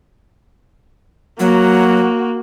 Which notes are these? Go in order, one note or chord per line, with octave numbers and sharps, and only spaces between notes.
F#3 A#3 F#4